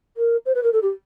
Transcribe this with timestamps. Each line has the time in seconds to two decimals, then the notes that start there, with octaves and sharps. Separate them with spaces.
0.17 A#4
0.45 C5
0.54 B4
0.63 A#4
0.72 A4
0.82 G4